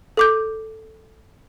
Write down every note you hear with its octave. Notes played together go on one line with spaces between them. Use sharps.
A4 D6 G6